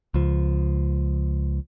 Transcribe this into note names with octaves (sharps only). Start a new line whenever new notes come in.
C#2 F3